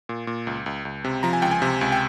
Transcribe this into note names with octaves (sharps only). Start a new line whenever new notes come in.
A#2
A#2
C#2
C#2
C#2
C3
F3 A#5
G#5
C#2 G5
G#5
C3
C#2
G5